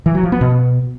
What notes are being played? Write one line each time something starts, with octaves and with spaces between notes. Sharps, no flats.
E3
F#3
F3
B3
B2